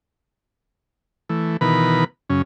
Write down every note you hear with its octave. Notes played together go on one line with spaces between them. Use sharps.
E3 A3
B2 D#3 E3 A#4 B4 B5
F#2 C#3 C#4